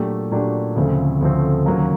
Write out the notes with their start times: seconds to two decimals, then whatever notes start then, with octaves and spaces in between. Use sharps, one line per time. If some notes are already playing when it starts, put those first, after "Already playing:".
Already playing: A#2 F#3 A3 D4 G4
0.31 A#2 F#3 A3 D4 G4
0.76 D2 C#3 F3 A3 C4
1.21 D2 C#3 F3 A3 C4
1.66 D#2 C#3 F#3 A#3